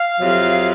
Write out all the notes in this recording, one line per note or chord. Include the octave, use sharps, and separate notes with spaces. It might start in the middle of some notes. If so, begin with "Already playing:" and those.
Already playing: F5
F2 C3 F#3